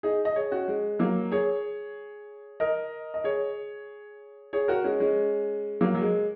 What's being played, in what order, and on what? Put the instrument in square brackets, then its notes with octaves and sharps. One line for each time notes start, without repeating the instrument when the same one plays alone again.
[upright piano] D#4 G#4
D#5
G#4 C#5
C#4 F#4
G#3
F#3 A#3
G#4 C#5
A#4 D#5
D#5
G#4 C#5
G#4 C#5
F#4 A#4
G#3 C#4
G#3 C#4
F#3 A#3
F#3
G#3